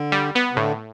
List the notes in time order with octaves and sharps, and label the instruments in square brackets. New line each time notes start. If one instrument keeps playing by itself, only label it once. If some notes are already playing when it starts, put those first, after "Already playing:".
Already playing: [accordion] D3
[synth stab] G3
B3
[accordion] C3
[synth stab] A2 [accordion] D3